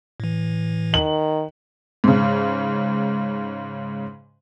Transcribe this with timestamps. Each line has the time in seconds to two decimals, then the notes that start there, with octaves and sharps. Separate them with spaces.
0.20 A2 E3
0.94 D#3 F#7
2.04 G#2 C#3